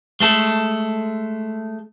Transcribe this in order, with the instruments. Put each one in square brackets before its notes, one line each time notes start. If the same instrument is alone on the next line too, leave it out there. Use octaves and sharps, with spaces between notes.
[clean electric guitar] G#3 A3 A4